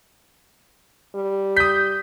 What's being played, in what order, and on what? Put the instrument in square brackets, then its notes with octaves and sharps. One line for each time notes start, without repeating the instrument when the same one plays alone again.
[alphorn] G3
[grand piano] D#6 B6 [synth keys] G6